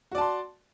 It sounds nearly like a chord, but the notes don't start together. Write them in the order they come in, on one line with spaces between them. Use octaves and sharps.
F#4 D5 A5 C6